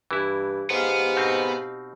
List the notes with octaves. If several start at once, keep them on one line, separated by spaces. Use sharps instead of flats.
G2 E3 E4
G#2 B3 G4 F5
B2 C4 D#4